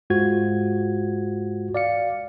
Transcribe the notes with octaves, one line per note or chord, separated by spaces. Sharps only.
G#2 G#3 F4 F#4 C5 G#6
D5 F5 C#7